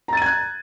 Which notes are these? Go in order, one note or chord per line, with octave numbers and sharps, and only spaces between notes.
A#5 F#6 G#6 A6 D#7